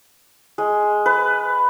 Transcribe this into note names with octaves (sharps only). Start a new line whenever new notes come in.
G#3
B4